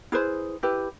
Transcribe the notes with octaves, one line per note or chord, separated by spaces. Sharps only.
E4 G#4 B4 C5
E4 G4 B4